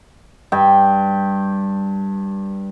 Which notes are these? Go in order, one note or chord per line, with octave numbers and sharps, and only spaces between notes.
G2 G5